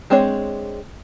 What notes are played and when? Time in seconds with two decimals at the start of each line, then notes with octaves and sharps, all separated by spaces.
0.10 G#3 C4 D4 C#5